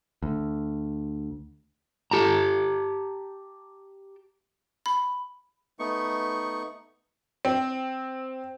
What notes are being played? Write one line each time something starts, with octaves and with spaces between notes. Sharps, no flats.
D2
G4 A5 A#5
B5
A3 B3 D#4 C#6
C4